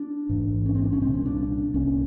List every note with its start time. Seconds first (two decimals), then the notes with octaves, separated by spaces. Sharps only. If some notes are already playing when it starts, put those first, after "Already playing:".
Already playing: D4
0.29 A1 G#2
0.66 C#4
0.75 C4
0.84 D4
0.93 C#4
1.02 C2 C4
1.06 A#2
1.14 C#4
1.26 D4
1.74 C2 A#2 C#4